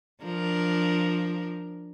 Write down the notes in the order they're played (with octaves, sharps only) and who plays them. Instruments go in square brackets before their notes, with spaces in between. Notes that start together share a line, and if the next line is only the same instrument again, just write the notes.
[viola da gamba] F3 D4 A#4